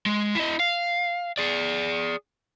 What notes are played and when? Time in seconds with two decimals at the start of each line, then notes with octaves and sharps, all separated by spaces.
0.06 G#3
0.35 E4 D#5
0.60 F5
1.38 G#4 D5